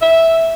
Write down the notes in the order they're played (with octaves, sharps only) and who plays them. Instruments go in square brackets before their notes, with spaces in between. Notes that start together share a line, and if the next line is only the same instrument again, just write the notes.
[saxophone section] E5